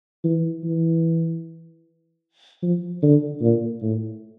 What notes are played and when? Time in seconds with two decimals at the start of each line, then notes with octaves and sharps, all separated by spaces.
0.24 E3
0.64 E3
2.62 F3
3.03 D3
3.41 A#2
3.81 A2